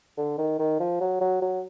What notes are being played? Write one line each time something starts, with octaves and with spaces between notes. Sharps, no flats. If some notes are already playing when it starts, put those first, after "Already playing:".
D3
D#3
D#3
F3
F#3
F#3
F#3